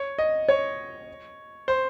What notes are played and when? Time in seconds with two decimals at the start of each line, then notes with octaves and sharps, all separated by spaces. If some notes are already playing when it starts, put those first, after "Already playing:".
Already playing: C#5
0.18 D#5
0.49 C#5
1.68 C5